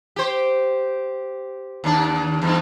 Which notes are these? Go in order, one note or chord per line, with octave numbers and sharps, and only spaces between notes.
G4 C5
D#2 D4
E2 G2 D#4